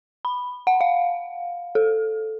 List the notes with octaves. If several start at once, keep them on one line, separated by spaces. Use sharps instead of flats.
B5
F#5
F5
A4